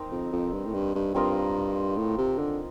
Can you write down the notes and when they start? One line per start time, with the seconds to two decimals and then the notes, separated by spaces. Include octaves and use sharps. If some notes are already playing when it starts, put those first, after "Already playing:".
Already playing: C4 D#4 A#4
0.12 F2
0.32 F2
0.53 G2
0.66 A2
0.74 G2
0.95 G2
1.14 G2 C4 F4 A#4 D#5
1.97 A2
2.18 C3
2.38 D3